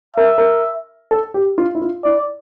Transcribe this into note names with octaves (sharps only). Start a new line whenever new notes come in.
A#4 E5
A#4
A4
G4
F4
E4
F4
E4 D5